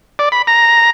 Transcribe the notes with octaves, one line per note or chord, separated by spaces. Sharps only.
D5
B5
A#5